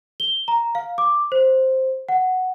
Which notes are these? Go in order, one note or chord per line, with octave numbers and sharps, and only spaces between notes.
G7
A#5
F5
D6
C5
F#5